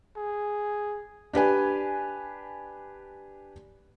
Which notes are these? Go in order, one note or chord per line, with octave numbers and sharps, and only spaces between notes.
G#4
D4 G4 B4 G#5